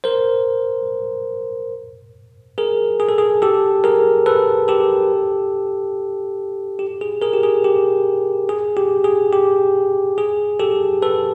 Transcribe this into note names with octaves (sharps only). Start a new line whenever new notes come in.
A#4 C5
G#4 A#4
G#4
A4
G#4
G4 A4
G#4 A#4
A4 B4
G4 A4
G4
G#4
G#4 A#4
G4
G#4
G4
G#4
G4
G#4
G4
G#4
G4 A4
A4 B4